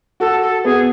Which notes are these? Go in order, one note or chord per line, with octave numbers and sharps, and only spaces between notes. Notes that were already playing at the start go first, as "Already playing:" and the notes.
F#4 A4
A4
B3 G#4